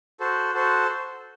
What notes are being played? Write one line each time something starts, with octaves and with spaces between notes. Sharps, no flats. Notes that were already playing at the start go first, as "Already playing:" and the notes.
F#4 A4 C5
F#4 A4 C5